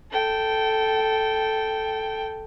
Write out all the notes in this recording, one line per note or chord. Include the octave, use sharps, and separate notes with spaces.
A4 G5